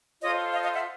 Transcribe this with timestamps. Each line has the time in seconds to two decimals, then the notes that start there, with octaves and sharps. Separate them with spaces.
0.21 F4 A4 C5 C#5 D#5
0.53 D#5 F5
0.63 D#5 F5
0.73 E5 F#5